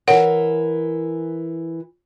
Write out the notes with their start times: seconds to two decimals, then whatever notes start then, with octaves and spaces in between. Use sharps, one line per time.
0.07 E3 A#4 C#5 F#5